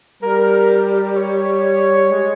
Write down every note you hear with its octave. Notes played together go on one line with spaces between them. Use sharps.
G3 A#4
C#5
G#3